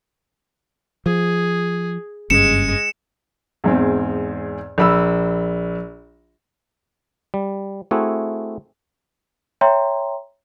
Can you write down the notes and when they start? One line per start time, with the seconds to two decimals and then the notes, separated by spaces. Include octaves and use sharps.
1.06 F3 G#4
2.30 F#1 G2 G#3 C#4 C#7 E7
3.64 E2 G#2 C4
4.78 A#1 B5 E6
7.34 G3
7.91 A3 C4 E4 F#4 G#4
9.61 C#5 E5 G5 A#5 C6